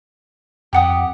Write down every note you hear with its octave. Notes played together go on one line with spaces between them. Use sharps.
F2 G4 F#5 D#6